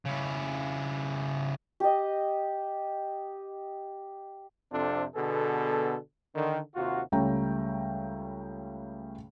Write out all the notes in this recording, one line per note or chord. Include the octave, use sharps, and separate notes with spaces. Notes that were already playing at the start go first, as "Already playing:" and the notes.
C#3 E4
G4 D#5
F2 C3 C4 D4 F4 A4
B2 D3 B3 G#4 A4
D3 D#3
D#2 C3 F4 F#4
C#2 G3 A3 C#5 G5 A#5